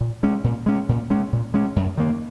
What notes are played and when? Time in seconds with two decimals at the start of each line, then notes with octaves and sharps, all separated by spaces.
0.01 A#2
0.23 G#3 C#4
0.44 A#2
0.66 G#3 C#4
0.89 A#2
1.10 G#3 C#4
1.33 A#2
1.54 G#3 C#4
1.76 F#2
1.98 D#3 A#3